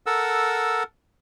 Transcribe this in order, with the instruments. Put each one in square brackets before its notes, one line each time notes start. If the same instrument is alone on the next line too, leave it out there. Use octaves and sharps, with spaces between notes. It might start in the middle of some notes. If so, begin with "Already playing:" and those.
[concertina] A4 A#4 F#5 E6